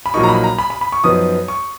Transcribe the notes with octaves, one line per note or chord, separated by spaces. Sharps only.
B5
A#1 A#2 F#3 A#3 D#4 C#6
A#5
B5
A#5
B5
B5
B5
C#6
F#2 F3 B3 D#4 D#6
C#6